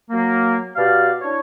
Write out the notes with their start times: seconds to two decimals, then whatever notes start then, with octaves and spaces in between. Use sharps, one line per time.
0.10 F#3 A#3
0.75 B2 G4 D5 F5
1.21 D4 E4 C#5